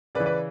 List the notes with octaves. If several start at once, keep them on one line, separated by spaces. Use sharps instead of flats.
C#3 B4 D5
E3
B4 D5